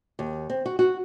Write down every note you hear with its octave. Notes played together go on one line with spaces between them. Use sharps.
D#2
C4
F#4
F#4